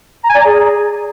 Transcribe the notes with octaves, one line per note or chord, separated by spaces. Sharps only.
A#5
G#5
D5
A#5
G#4